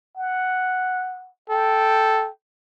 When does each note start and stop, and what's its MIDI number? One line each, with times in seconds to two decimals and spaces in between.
0.17 1.30 78
1.50 2.28 69
1.50 2.30 79